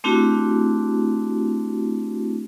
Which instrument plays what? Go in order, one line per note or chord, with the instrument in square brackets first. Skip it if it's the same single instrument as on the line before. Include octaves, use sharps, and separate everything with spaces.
[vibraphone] A3 C4 D4 E4 F#4 G4